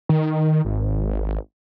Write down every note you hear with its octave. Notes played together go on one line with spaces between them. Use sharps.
D#3
G#1